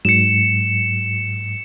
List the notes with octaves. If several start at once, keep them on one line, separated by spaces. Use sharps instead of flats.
G#2 F#3 C#7 E7